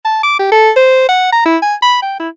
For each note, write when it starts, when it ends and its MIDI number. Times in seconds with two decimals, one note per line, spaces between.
0.05 0.22 81
0.23 0.35 86
0.39 0.50 67
0.52 0.71 69
0.76 1.05 72
1.09 1.30 78
1.32 1.43 82
1.46 1.57 64
1.62 1.75 80
1.82 2.00 83
2.02 2.18 79
2.19 2.29 64